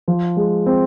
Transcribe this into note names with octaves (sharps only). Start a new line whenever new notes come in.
F3
G#3
C4